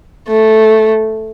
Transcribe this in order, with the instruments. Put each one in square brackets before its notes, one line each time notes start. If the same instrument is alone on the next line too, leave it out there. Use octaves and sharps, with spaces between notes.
[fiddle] A3